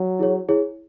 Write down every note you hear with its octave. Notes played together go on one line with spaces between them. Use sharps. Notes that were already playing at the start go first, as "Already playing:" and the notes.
Already playing: F#3
E4 G#4 C#5
E4 G#4 C#5